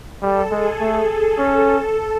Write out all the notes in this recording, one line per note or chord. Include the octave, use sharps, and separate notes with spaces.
G3 A4
G#3 G#4
A3 G#4
C#4 A4